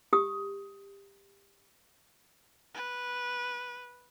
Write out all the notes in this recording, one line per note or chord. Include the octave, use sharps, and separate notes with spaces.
G4 D#6
B4